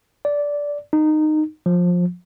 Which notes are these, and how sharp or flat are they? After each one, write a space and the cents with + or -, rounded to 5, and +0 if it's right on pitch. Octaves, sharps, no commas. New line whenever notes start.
D5 -15
D#4 -15
F3 +20